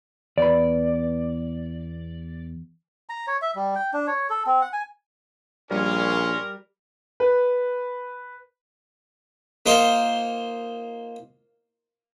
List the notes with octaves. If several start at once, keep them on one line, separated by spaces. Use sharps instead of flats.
E2 B4 D5 B5
A#5
C#5
E5
G3
G5
D4
C#5
A4
C4
F#5
G#5
A#1 G3 C#4 A#4 C6
B4
A#3 D#4 F4 C5